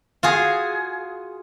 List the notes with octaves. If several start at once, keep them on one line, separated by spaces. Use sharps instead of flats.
F4 F#4 G#4